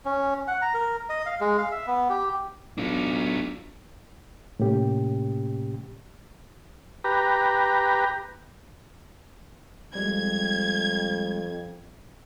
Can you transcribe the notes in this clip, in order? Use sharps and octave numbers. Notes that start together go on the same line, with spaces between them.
C#4
F#5
A#5
A#4
D#5
F5
G#3
F5
E5
B3
G4
B1 D4 F4
A2 C3 A#3 C#4 G4
G4 B4 A#5
F2 G3 G#3 G#6